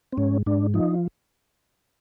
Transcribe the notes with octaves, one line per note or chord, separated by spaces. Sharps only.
C4
G#2 C#4
G#2 D4
F3 D#4